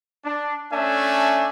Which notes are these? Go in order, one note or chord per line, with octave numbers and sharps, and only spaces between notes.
D4
A3 C#4 D4 E5 G#5